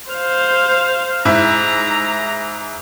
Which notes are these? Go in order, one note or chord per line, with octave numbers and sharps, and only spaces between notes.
C5 F5
G#2 E4 A#5